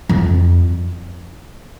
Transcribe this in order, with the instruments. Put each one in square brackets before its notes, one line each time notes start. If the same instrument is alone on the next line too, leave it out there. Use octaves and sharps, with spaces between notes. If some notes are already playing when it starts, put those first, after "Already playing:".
[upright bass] F2